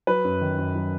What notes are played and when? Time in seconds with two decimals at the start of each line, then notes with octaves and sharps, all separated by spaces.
0.07 F#3 B4
0.25 F#2
0.41 D#3
0.58 F#2
0.76 F#3